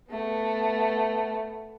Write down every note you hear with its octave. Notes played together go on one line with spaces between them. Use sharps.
A3 B3